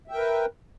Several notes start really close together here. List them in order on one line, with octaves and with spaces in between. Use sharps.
E5 G5 A#4 B4